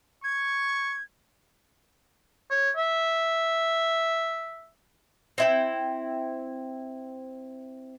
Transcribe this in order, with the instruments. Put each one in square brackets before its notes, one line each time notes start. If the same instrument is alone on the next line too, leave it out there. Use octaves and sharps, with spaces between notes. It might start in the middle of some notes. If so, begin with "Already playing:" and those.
[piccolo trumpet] C#6 [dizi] G#6
[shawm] C#5
E5
[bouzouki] C4 E4 G5